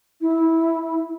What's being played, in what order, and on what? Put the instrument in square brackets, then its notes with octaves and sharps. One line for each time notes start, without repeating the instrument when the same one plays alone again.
[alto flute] E4